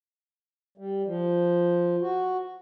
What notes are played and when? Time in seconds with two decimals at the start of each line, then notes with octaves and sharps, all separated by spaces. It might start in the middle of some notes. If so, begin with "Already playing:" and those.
0.78 G3
1.06 F3
2.01 F#4